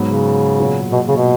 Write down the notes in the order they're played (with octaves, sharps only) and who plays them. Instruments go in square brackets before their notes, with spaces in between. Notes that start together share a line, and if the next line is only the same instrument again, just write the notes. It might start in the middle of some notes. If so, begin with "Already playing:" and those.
Already playing: [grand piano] G#2 F#3 B3
[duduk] C#3
[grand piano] A#2 F#3 B3 F4 G#4
[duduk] B2
C#3
B2